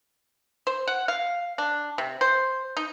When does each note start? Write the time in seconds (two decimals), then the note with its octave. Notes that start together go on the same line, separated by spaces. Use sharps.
0.67 C5
0.88 F#5
1.08 F5
1.58 D4
1.98 C3
2.21 C5
2.77 D#4